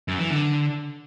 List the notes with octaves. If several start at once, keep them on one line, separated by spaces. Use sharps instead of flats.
F#2
E3
D3